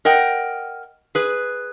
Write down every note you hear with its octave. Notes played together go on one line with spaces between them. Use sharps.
A#4 D#5 F#5 G5
G#4 B4